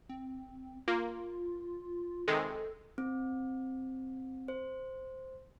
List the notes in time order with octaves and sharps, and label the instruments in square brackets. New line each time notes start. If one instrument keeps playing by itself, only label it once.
[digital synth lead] C4
[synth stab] A#3 [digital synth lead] F4
[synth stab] C3 D#3 G#3 [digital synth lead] A4
[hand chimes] C4
C5